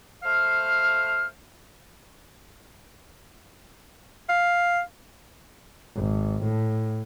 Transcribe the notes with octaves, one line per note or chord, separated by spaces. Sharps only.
A3 C5 F5 F6
F5
G#1
A2